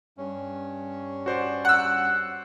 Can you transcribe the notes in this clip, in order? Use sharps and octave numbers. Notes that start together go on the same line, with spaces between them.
G2 C#4
F#4 C5 D5
F#5 E6